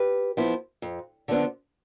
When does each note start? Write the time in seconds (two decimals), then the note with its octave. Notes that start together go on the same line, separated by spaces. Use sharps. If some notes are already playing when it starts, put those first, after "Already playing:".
Already playing: G4 B4
0.37 F3 B3 E4
0.82 F2
1.28 D3 F3 B3 D4